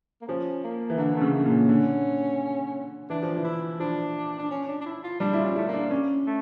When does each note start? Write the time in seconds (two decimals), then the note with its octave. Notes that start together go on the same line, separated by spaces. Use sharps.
0.22 A#3
0.28 F3 C#4
0.64 A#3
0.90 E3
0.98 D3 A#3
1.16 C#3 A3
1.34 A#3
1.45 A#2
1.51 C#4
1.69 D3
3.10 E3 D4
3.23 F3
3.36 E3
3.44 E4
3.80 F3 D4
4.39 D4
4.51 C#4
4.68 D4
4.81 D4
4.86 E4
5.04 F4
5.20 G3 D4
5.33 E4
5.38 F4
5.44 C#4
5.56 A3 E4
5.68 A#3
5.73 D4
5.91 C#4
6.26 A3